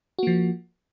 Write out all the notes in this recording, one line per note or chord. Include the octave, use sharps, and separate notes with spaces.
F3 A#3 F#4